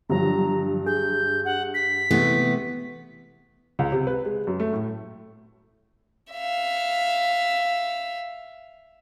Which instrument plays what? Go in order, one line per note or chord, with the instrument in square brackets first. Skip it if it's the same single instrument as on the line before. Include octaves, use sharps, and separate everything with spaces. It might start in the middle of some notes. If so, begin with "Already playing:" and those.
[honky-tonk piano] G2 [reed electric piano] D3 F3 F#3 [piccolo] A#5
[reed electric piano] G#4 [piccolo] G6
[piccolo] F#5
B6
[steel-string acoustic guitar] C3 A3 B3 [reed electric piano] E3
[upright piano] C#2
C3
B4
G#3
F#2
A3
A2
[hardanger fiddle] E5 F5